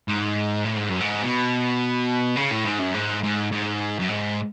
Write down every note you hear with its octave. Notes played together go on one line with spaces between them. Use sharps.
G#2
A2
G#2
F#2
G#2
B2
C#3
A2
G#2
F#2
G#2
G#2
G#2
F#2
G#2